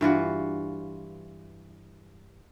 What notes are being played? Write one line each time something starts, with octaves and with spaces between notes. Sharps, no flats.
G2 E3 F4 F#4